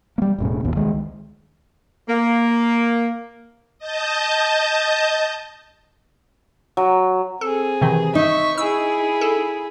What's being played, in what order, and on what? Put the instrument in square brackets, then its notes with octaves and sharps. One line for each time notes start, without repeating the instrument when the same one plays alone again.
[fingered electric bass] G3 A#3
E1 A2 C#3
G1 D#2 B2
C#2 D#3 G#3
[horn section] A#3
[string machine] D#5 A5 G6
[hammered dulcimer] F#3
[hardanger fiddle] C4 G#4 [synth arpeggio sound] A4
[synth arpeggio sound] C3 D#3 E3
[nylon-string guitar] D#4 [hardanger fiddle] E5 C#6
[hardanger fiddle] E4 G#4 [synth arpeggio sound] E6
[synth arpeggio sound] A4